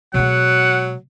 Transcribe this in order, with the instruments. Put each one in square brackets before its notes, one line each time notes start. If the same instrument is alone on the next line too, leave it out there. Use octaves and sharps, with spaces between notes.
[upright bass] B2 G#3 [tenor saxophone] F#3 [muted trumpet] F#5